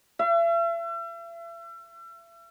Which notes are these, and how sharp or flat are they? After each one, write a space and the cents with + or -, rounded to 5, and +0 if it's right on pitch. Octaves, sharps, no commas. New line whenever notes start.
E5 +40